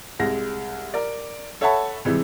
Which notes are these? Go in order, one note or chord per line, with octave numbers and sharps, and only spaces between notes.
C2 G#3 A#6
A#4 D5
A4 C#5 E5 F#5 A5 B5
C3 E3 G3 G#3